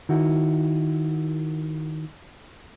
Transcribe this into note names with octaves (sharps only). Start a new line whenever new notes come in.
D#3 E4 F#4